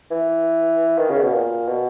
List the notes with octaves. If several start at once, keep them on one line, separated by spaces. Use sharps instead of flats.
E3
D#3
C#3
B2
A#2
B2